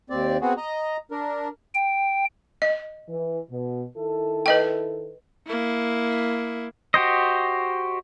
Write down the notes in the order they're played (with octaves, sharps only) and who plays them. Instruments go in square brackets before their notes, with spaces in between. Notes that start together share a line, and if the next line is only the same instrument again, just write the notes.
[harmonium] D#2 C4 D5
B3 C4 F#4 G#4
D#5 A#5
D4 A#4
[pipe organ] G5
[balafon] D#5
[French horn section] E3
B2
D#3 E4 A4
[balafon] B4 D#5 G5
[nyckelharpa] A#3 E4
[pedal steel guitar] F#4 G4 C5 D#5